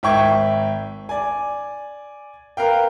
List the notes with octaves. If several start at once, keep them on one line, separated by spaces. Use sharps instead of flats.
G#1 E5 G5 C#6 G#6
D5 G#5
A#4 B4 F5 G5